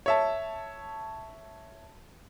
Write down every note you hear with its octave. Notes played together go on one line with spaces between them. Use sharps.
C#5 E5 A5